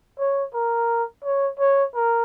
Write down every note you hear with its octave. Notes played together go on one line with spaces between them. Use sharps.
C#5
A#4
C#5
C#5
A#4